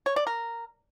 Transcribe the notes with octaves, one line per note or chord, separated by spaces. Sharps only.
C#5
D5
A#4